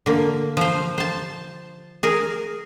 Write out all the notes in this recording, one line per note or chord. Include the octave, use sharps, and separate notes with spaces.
D3 A#3
F3 C5
C5 A5
G#4 A#4